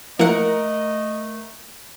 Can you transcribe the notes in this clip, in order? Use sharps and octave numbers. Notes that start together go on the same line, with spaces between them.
F3 A3 A#3 E4 A#4 D#5 F#5